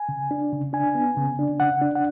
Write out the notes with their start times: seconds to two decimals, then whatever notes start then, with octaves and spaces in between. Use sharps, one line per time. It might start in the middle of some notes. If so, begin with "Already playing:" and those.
Already playing: G#5
0.09 C#3
0.31 D4
0.52 C#3
0.73 D4 G#5
0.95 B3
1.17 C#3
1.39 D4
1.60 C#3 F#5
1.82 D4
1.96 F#5